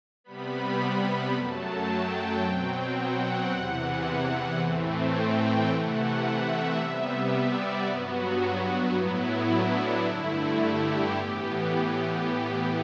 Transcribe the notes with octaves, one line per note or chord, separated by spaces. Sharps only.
C3 G3 B3 B5
F#2 F#3 A3 A5
G5
B2 F#3 C4
F#5
E2 C3 E3
A2 E3 A3 C4
G5
C3 E3 A3 F#5
E5
C3 G3 B3
D5
G2 F#3 B3 F#4
A2 F#3 B3 E4
D4
G2 D3 A3 E4
G4
A2 E3 B3